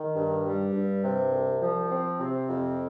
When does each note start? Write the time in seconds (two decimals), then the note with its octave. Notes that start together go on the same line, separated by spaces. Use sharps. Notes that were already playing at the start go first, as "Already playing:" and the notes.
Already playing: D#3
0.16 G2
0.44 G3
0.73 G2
1.03 C3
1.31 C2
1.61 F3
1.90 C4
2.20 C3
2.49 F2